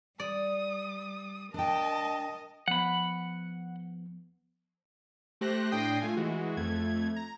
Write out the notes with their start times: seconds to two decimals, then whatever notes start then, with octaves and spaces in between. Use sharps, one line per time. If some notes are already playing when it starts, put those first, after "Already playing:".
0.20 G3 D5 D#6
1.54 D4 A#4 D#5 G5 A5
2.68 F3 B3 F#5 B5
5.41 A3 G4 C5 F#6 A#6
5.71 A2 D4 G5 D#6 A#6 C7
6.00 A3 F4 G#5
6.17 E3 G#3 F#4
6.57 F2 A3 G#6
7.16 A#5